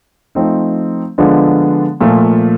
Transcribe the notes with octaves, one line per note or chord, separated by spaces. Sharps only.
F3 A3 C4 D#4
D3 F3 G#3 B3 D4
A#2 F3 A3